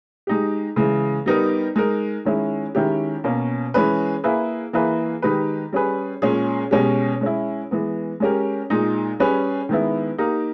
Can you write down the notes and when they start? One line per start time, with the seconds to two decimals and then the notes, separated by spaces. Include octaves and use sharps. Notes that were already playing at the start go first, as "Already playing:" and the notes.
0.27 G#3 D#4 G4
0.76 C#3 E3 G#3
1.26 G3 B3 D#4 G4 A#4
1.76 G#3 D#4 A#4
2.25 D#3 G#3 C#4 E4
2.75 D#3 G#3 C#4 E4 G4
3.24 B2 A#3 C#4
3.74 E3 G#3 C#4 G#4 B4
4.24 A#3 E4 G#4 B4
4.73 E3 A#3 E4 G#4 B4
5.22 D#3 G#3 D#4 G4 B4
5.73 G3 C#4 G#4 B4
6.22 A#2 G#3 C#4 G#4
6.71 B2 G#3 C#4 G4
7.21 G#3 C#4 E4
7.71 E3 G#3 B3
8.20 G#3 C#4 G4 A#4
8.70 A#2 G#3 D#4
9.20 G3 C#4 G#4 B4
9.69 D#3 G#3 B3 E4
10.18 A#3 D#4 G4 A#4